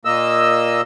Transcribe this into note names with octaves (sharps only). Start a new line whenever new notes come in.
A#2 A#3 D#5 E6